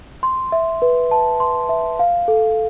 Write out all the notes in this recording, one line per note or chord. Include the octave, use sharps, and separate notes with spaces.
C6
E5
B4
A5
C6
E5
F5
A4